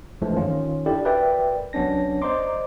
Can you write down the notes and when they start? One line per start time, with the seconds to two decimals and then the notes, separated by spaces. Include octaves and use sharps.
0.21 C#2 G2 E3 F3 G#3 A3
0.37 D#3 C#4 F4
0.86 D4 E4 G4 A4 D5
1.04 F#4 A#4 B4 D5 E5 G5
1.73 C2 F#3 B3 C#4 D4 A#6
2.22 C5 D5 D#5 A#5 C6 D6